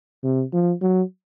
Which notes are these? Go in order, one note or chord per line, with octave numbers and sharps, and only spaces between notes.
C3
F3
F#3